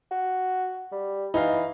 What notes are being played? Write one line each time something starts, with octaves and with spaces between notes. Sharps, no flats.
F#4
G3
E3 D#4 F5